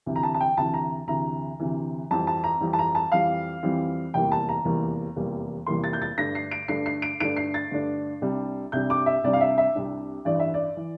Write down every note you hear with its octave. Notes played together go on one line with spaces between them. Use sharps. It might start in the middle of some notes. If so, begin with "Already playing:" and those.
D2 C3 E3
A#5
A5
A5
G5
D2 C3 E3 A5
A#5
D2 C3 E3 A#5
D2 C3 E3
F2 E3 G3 C4 A5
A5
A#5
F2 E3 G3 C4
A5
A#5
A5
F2 E3 G3 C4 F5
F2 E3 G3 C4
F1 E2 E3 G3 A#3 G5
A5
A#5
F1 E2 E3 G3 A#3
F1 E2 E3 G3 A#3
F1 E2 E3 G3 A#3 C6
A6
G6
A6
G2 D3 A3 D4 A#6
C7
D7
G2 D3 A3 D4 C7
C7
D7
G2 D3 A3 D4 D7
C7
A6
G2 D3 A3 D4
C2 C3 G3 D4
C2 C3 G3 D4 G6
D6
E5
C2 C3 G3 D4 D5
F5
E5
E5
C2 C3 G3 D4
A1 G2 E3 D5
E5
D5
E3